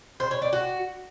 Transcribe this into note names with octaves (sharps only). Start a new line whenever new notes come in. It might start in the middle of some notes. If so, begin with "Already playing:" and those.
C5
C#5
D5
F#4